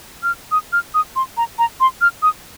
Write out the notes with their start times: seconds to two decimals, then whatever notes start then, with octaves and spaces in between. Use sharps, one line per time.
0.23 F6
0.52 D#6
0.73 F6
0.94 D#6
1.16 C6
1.37 A#5
1.59 A#5
1.80 C6
2.01 F6
2.22 D#6